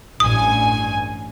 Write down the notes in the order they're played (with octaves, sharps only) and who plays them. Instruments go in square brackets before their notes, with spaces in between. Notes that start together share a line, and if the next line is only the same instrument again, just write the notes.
[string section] A1 G2 G#5 [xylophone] D#6